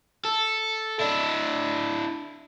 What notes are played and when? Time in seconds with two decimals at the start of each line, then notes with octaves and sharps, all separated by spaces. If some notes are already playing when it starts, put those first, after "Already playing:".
0.25 A4
0.99 D4 E4